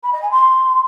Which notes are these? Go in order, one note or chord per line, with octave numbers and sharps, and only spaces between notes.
B5
D#5
G#5
C6